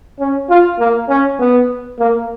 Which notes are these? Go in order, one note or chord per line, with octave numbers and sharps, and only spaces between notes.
C#4
F4
A#3
C#4
B3
A#3